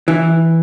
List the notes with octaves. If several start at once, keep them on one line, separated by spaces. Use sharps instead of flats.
E3